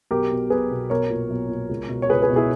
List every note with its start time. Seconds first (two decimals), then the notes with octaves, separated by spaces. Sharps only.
0.11 B1 G4 A#4
0.32 B2
0.50 B1 G#4 B4
0.71 B2
0.90 B1 A#4 C#5
1.10 A#2
1.30 B1
1.49 A#2
1.69 C#2
1.89 B2
2.02 C#5
2.09 C#2 G#4 B4
2.22 G#4 B4
2.30 B2
2.36 E4 G#4